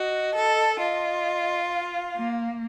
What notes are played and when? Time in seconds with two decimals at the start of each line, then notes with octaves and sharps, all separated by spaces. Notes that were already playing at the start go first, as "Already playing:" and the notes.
Already playing: F#4 D#5
0.33 A4
0.78 F4 D#5
1.70 F5
2.16 A#3